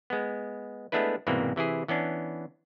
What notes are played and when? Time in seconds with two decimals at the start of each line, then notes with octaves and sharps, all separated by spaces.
0.10 G#3 B3
0.92 G#3 A3 B3 D4 E4 B4
1.27 C2 G#2 B2 E3 A#3 C4
1.56 C3 E3 E4 G#4
1.88 E3 B3 C#4 D4